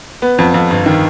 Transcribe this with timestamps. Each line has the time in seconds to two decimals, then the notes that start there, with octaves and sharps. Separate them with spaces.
0.22 B3
0.38 F2
0.54 F2
0.71 G1
0.86 D#3